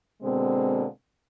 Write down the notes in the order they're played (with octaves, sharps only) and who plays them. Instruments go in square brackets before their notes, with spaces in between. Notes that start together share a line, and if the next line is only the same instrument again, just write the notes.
[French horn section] B2 D3 G#3 A#3 C4